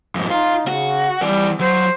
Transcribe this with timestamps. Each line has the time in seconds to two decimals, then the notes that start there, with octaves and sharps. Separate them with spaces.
0.15 F2 G#2
0.30 D#4 F4
0.68 C#3 F#4
1.22 E3 G3 D5
1.60 F#3 C5